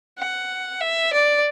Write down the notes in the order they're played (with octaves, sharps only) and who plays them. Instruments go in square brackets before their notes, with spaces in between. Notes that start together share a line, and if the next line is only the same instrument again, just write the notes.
[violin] F#5
E5
D5